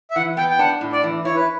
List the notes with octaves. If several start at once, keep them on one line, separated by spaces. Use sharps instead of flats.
E5
E3 F#5
B3 G5
G5
D4 F#5
A2
D5
E3
E4 C#5
B4